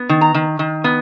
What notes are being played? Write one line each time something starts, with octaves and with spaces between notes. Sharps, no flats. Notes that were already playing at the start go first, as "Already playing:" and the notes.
Already playing: B3
D#3
A#5
D#3
D#3
B3